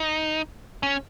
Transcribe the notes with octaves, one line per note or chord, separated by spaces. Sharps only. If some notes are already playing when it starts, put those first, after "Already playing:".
Already playing: D#4
C#4